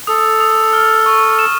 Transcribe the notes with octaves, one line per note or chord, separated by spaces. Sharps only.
A4 D#6
D#6
F6
C#6
E7